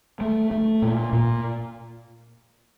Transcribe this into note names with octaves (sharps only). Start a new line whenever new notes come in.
A3
A3
A#2
A#2